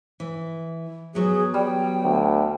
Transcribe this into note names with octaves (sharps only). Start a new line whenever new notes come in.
E3
F#3 B3 G#4
G3 G5
D2